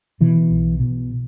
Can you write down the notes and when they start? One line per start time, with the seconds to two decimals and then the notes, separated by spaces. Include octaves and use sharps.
0.21 B2 E3
0.51 B1
0.80 B2